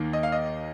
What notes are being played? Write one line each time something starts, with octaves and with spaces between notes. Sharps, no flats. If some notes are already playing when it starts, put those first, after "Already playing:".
Already playing: D#2 D#3 A#3
D#5
F5
D#5